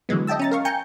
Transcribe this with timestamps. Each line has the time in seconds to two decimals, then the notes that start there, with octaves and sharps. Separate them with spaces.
0.09 D3 E3 F#3 G#3 B3
0.27 D#5 E5 G5 A5 E6
0.39 C#4 A#5 A6
0.51 A#4 F5 C#6
0.65 G5 G#5 A#5 G6 C#7